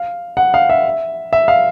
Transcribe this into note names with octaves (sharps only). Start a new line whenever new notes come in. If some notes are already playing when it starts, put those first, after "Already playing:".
Already playing: F5
F#5
F5
E5
E5
F5